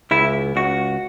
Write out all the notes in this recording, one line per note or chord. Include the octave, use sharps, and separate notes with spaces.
C#2 E4
C#2 F#4